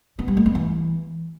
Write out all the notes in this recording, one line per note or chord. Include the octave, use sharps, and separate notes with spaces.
B3
G3
A3
B3
E3